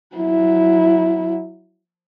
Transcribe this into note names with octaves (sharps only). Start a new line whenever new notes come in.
F#3 E4